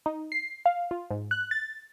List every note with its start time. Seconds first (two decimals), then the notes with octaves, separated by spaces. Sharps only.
0.06 D#4
0.32 C7
0.66 F5
0.91 F4
1.11 G#2
1.31 F#6
1.51 A6